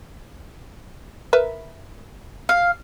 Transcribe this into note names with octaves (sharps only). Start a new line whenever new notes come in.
A#4 B4 E5
F5